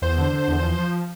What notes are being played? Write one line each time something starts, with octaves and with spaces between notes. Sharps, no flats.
E2 C5
D3
D3
E2
F3
F3